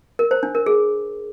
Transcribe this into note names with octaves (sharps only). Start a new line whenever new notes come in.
A#4
C5
D4
A#4
G#4